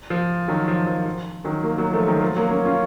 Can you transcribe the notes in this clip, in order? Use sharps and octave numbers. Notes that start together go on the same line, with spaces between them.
F3
D#3 F#3
F3
F3
F3
D#3 F#3
F#3 A#3
F#3 A#3
F3 A3
D#3 F#3
F3 A3
F#3 A#3
A#3 C#4
C#4 F4